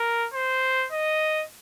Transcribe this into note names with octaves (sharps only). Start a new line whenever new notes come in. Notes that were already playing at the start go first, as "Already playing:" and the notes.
Already playing: A#4
C5
D#5